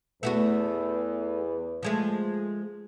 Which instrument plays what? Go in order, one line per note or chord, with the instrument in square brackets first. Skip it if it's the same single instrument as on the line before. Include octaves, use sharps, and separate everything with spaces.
[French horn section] E2 B4 [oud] A3 B3 F#4
[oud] F3 G#3 A3